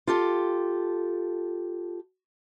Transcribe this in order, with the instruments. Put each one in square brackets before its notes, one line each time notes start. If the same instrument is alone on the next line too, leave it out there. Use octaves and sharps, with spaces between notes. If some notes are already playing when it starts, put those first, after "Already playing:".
[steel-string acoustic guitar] F4 G4 A4